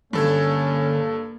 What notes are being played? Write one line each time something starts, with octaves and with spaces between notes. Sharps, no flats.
G2 D3 A#3 C#4 A4 G#6